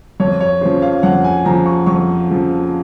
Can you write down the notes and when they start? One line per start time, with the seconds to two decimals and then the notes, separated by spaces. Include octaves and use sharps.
0.20 F2 C#5
0.40 C#5
0.61 C#3 F3 C5
0.82 F5
1.03 F2 F#5
1.24 G#5
1.44 C#3 F3 A#5
1.66 C#6
1.86 F2 C#6
2.28 C#3 F3